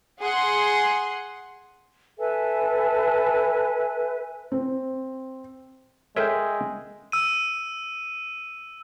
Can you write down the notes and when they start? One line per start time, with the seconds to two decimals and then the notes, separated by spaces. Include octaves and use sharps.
0.19 G#4 F#5 C6
2.17 A4 B4 E5 G#5
4.52 C4
6.16 G#3 A4 A#4 C#5 E5 G5
7.12 E6 D#7